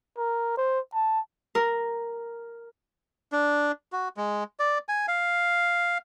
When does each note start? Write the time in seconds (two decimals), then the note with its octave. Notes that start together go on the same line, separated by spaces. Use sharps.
0.17 A#4
0.57 C5
0.94 A5
1.55 A#4
3.32 D4
3.92 F#4
4.17 G#3
4.59 D5
4.89 G#5
5.08 F5